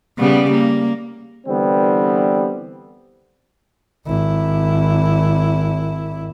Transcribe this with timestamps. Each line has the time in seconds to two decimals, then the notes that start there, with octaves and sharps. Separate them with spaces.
0.18 C#3 G3 B3
0.50 A#3
1.47 D3 E3 G3 B3 C4
4.07 G#1 E4